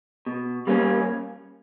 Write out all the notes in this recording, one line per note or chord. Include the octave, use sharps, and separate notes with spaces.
B2
G3 A#3 C#4